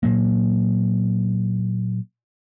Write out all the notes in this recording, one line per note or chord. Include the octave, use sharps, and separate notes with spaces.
A#2 F#3 A#3